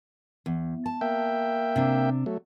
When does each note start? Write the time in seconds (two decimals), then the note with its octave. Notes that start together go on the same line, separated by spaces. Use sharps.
0.46 E2
0.86 A5
1.01 A#3 E5 G5
1.76 C3 D4
2.26 F#3 A3